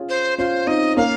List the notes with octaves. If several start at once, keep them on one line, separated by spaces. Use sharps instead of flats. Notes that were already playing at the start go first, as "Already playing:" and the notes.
Already playing: C#4 F4 G#4
C5
C#4 F4 C5
C4 D#4 D#5
A#3 C#4 F5